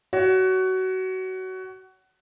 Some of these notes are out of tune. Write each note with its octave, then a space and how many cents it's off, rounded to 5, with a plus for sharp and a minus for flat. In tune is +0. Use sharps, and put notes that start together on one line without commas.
F#4 +20 C#5 +25